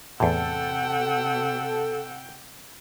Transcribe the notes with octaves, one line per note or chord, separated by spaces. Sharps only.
E2 A2 C3 A4 F#5 G5 E6